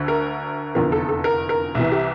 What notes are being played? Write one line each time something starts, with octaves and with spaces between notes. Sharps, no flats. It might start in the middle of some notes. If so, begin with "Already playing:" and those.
Already playing: D2 D3
A#4
F1 E2 D3 F3 A#4
A4
A4
A#4
A#4
C2 C3 E3
G4